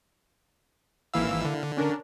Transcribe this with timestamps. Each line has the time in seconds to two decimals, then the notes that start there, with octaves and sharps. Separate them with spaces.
1.14 G#1 E3 A#3 E4 F5 E6
1.45 D3
1.77 C#4 D4 A#4